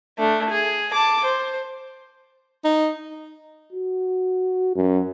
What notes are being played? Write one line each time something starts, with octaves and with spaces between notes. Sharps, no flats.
A3 D4
G#4
A5 D6
C5
D#4
F#4
F#2